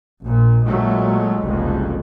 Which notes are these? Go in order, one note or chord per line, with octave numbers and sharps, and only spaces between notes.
A#1 A#2
A#2 F#3 G#3 A3
F#1 C2 F2